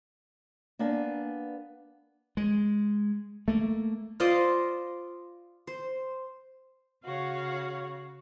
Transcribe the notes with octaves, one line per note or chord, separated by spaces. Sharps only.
A#3 B3 D4 G#5
G#3
A3 A#3
F4 C5 D5 D#5
C5
C#3 F#4 C#5 F5